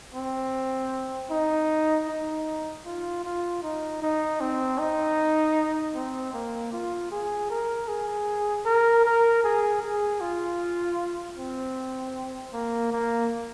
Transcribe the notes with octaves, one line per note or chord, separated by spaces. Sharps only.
C4
D#4
D#4
F4
F4
D#4
D#4
C4
D#4
C4
A#3
F4
G#4
A#4
G#4
A#4
A#4
G#4
G#4
F4
C4
A#3
A#3